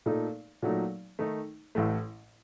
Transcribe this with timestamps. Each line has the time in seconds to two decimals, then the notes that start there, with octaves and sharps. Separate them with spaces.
0.06 A#2 A3 D#4 A4
0.62 A#2 F#3 A3 D#4
1.19 D#3 A3 D#4
1.75 A1 A2 A3